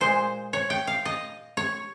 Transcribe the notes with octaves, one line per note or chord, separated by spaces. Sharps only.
A#2 G#3 C5
C#5
G5
F5
D#5
C#5